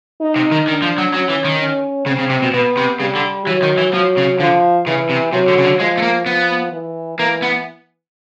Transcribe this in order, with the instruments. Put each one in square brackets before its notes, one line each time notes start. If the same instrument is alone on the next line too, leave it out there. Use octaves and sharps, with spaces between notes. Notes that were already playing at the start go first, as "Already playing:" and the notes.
[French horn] D#4
[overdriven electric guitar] C3
D#3
[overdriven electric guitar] D#3 [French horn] D4
[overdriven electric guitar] F3
F#3
[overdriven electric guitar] F#3 [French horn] C#4
[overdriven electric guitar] E3
D#3
[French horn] C#4
[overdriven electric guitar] C#3 [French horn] C4
[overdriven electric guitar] C#3
C3
B2
[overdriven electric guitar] B2 [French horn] B3
[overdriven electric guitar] C3
[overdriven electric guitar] C#3 [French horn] G3
[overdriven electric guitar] D3
[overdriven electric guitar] E3 [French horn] F#3
[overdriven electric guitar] D#3
E3
[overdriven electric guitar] F3 [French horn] F#3
[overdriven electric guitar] C#3
[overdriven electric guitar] D3 [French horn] F3
[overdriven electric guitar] C#3 [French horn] E3
[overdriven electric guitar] C3
[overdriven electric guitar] C3 [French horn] F#3
[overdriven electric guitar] D3
C#3
D3
[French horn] F3 [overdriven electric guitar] G#3
[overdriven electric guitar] A3
A#3
[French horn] F3 [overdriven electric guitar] B3
[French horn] E3
[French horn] E3 [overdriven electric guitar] A#3
[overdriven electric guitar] B3